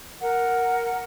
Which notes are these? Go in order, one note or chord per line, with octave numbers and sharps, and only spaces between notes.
A#4 F#5